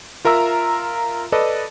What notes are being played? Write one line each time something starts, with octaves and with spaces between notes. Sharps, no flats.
F4 A#4 E5 A#5 E6
A4 B4 D5 D#5